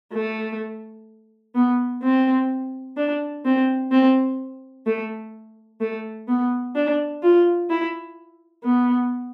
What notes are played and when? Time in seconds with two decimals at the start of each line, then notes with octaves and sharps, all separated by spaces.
0.13 A3
1.55 B3
2.02 C4
2.97 D4
3.45 C4
3.92 C4
4.86 A3
5.80 A3
6.28 B3
6.75 D4
7.22 F4
7.70 E4
8.64 B3